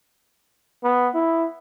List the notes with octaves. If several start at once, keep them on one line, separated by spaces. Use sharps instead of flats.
B3
E4